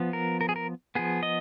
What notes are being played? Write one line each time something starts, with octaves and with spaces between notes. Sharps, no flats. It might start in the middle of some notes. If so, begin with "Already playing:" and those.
Already playing: F3 B3
A#4
A#4
G#4
A#4
F3 B3 G#4
D#5